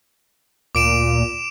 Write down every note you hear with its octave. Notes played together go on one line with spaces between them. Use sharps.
D2 A#2 D6 D7 E7